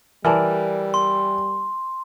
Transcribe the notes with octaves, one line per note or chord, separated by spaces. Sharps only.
E3 G3 A#4 D5 A5
C6